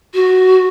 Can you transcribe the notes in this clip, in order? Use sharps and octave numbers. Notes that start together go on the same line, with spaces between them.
F#4